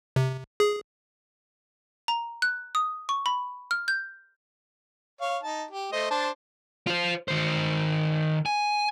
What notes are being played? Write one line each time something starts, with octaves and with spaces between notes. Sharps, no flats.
C3
G#4
A#5
F#6
D#6
C#6
B5
F6
G6
C#5 F5
D#4 A5
G4
A3 C5 D#5
D4 C5 A5
F4 C5
D#3 C5
G#5